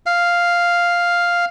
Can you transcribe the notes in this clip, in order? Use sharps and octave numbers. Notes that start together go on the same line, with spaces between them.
F5